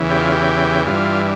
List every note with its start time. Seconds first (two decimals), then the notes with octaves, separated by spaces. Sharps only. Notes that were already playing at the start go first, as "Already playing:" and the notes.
Already playing: E2 C#3 E3
0.10 G4
0.21 F4
0.32 G4
0.87 G2 E3 F4